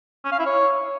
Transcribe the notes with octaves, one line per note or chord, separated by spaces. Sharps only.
C#4
F5
E4
C#5